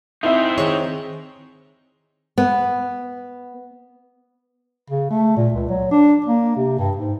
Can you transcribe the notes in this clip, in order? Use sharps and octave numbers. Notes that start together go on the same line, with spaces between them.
C4 D#4 E4 C5 E5
D#3 G#4 C#5
B3
C#3
A3
A#2
C#2
F#3
D4
A#3
C3
G2
G#2